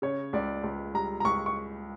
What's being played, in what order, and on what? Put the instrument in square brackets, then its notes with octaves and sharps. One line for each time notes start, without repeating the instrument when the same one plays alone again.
[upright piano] C#3 [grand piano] C#5
[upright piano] C#2 [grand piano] D5
[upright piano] C#2
[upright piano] G3 [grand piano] A#5
[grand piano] A#5
[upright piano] C#2 [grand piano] C#6
[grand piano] C#6